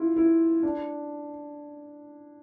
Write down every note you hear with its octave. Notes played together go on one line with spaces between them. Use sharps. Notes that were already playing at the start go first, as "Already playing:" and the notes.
Already playing: E4 F4
E4
D4